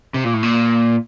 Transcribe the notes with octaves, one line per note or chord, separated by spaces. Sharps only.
C3
A#2
A2
A#2